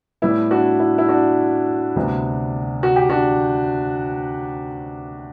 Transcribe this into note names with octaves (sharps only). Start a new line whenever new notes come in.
A2 G3 B3 E4
D4 F#4
E4
E4
D4 F#4
D2 C3 G3 B3
F#4
G4
D4 F#4